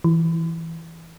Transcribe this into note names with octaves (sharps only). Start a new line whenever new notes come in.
E3